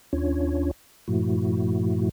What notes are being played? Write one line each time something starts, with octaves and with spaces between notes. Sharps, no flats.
D#2 C#4 D4 F4 C#5
G2 A#2 F3 A3 E4 F#4